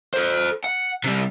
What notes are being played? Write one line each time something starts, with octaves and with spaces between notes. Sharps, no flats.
A4 C5
F#5
C3 G3